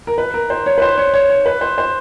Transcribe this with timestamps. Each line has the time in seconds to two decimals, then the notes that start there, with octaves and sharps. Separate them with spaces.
0.07 A#4
0.18 B4
0.34 A#4
0.50 C5
0.66 C#5
0.78 B4
0.82 C5
0.98 C#5
1.14 C#5
1.30 C#5
1.46 B4
1.61 C5
1.78 C5